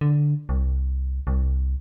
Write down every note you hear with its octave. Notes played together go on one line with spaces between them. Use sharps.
D3
C2
C2